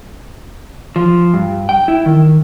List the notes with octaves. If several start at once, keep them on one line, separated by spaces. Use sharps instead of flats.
F3
G2
G5
E4
D#3